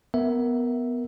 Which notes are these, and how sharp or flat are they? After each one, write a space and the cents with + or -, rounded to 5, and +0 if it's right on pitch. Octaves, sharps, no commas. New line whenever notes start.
B3 +5 A#4 +0 E5 +0